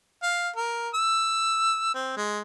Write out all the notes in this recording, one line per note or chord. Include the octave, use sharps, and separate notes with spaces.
F5
A#4
E6
C4
G#3